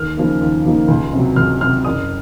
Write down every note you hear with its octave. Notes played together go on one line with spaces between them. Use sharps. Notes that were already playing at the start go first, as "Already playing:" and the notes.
Already playing: D#2 F6
C#3 F3 A#3 D#4
D#2
C#3 F3 A#3 D#4
C#2
C3 F#3
C#2 F6
C3 F#3 F6
F#1 D#6